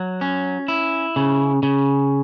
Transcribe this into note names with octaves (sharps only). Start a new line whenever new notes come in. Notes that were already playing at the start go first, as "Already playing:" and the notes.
Already playing: F#3
C#4
E4
C#3
C#3